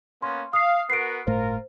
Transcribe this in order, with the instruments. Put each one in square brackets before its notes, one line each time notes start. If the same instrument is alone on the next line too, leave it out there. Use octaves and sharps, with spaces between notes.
[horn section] A#3 B3 C#4 [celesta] C6
[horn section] F5 [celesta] D#6 C7
[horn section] B3 F#4 A#4 [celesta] C7 D7
[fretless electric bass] G1 A2 A3 [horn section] F4 A#4 [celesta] C5